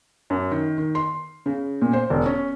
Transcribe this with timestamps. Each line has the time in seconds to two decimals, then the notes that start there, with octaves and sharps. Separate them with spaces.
0.30 F#2
0.51 D#3
0.78 D#3
0.95 C6
1.46 C#3
1.82 A#2
1.93 C5
2.10 E1
2.26 C#4